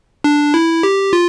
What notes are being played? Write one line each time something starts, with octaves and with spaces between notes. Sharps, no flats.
D4
E4
G4
F4